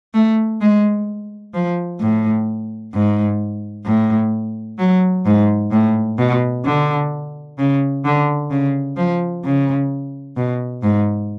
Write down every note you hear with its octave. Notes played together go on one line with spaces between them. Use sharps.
A3
G#3
F3
A2
G#2
A2
F#3
G#2
A2
B2
D3
C#3
D3
C#3
F3
C#3
B2
G#2